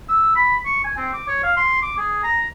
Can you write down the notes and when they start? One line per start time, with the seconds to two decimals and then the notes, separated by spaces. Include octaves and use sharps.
0.09 E6
0.35 B5
0.65 C#6
0.84 G#5
0.97 C4
1.13 D6
1.28 C#5
1.43 F5
1.57 C6
1.82 D6
1.98 G#4
2.23 A#5